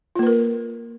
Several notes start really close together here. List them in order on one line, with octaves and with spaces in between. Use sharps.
F4 A#3 B4 A#4